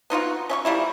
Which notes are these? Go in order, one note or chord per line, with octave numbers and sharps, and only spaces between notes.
B3 D#4 F4 F#4
C#4 E5 C#6
F3 G3 A#3 E4